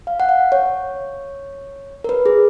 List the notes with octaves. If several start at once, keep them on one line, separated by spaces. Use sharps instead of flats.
F5
F#5
F5
C#5
A#4
B4
G#4